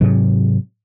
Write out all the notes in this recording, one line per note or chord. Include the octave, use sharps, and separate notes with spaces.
G#2 C3 F#3